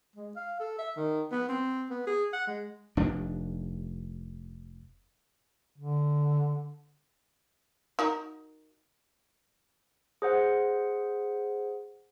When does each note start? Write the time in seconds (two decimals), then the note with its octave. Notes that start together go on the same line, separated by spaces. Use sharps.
0.16 G#3
0.36 F5
0.60 A4
0.78 E5
0.97 D#3
1.31 B3
1.49 C4
1.90 B3
2.07 G#4
2.33 F#5
2.47 G#3
2.97 F1 D#2 D4
5.78 D3
7.99 D#4 F#4 A#4
10.22 G#4 C5 F#5